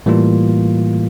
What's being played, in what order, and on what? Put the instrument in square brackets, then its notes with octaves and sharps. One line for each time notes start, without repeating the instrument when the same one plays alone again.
[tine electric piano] A2 E3 G3 A#3 F4